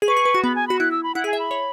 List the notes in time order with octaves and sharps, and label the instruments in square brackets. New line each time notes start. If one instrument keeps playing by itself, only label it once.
[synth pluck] G#4
[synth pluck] B4 [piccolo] C#6
[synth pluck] G#4
B4
F#4
[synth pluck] B3 [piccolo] B5
[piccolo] G#5
[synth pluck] F#4 [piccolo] B5
[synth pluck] E4 [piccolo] F#6
[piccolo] E6
B5
[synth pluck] E4 [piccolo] F#5
[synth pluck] G#4 [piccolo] G#5
[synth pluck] E5
[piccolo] B5
[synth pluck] C#5